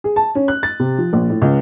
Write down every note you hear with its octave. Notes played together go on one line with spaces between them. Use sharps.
G#4
A5
C#4
F#6
A6
C3
F3
A#1
A2
C#2